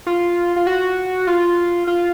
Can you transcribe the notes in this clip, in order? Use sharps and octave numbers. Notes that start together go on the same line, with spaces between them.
F4
F4
F#4
F4
F4